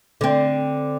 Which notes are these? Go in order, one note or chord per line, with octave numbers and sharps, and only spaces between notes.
D3 C4